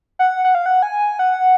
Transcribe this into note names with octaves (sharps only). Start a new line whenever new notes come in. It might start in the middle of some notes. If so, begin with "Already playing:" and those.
F#5
F#5
F5
F#5
G#5
F#5